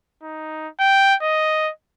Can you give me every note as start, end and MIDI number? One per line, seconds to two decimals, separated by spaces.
0.23 0.68 63
0.80 1.15 79
1.22 1.71 75